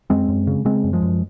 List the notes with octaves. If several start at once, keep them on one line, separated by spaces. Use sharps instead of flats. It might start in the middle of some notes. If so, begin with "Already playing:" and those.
F#2 G#3 C4
F#2
C#3
C#3 G#3 C4
F#2
F3 G#3
F#2